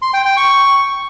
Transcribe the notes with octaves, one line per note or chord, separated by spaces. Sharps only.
C6
G5
G5
C#6